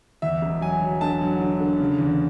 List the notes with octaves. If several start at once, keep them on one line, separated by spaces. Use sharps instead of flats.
E2 E5
E1
F#3 G#5
F#3
D3 A5
F#3
D3
D3
C#3
E2